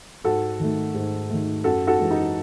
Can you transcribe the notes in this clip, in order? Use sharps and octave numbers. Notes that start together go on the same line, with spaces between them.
G#2 F#4 A4
D#3 A3
G#2
D#3 A3
F#2 F#4 A4
F#4 A4
E3 G#3
D#4 F#4